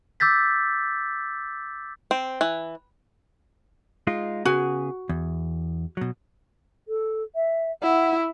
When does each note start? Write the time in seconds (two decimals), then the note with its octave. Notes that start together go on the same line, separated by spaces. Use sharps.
0.20 D6 E6 G6 A6 B6
2.11 C4
2.41 E3
4.07 G#3 D#4 F4
4.45 C#3 B3 F#4 G#4
5.09 E2
5.97 B2 F#3
6.88 A4
7.35 E5
7.83 E4 F#5